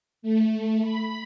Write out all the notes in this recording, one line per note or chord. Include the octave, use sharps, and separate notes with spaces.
A3
B5